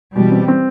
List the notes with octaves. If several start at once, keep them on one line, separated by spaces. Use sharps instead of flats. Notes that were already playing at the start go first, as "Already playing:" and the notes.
B2 E3 G3
C4
C4